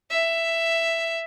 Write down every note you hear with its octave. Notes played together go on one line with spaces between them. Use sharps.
E5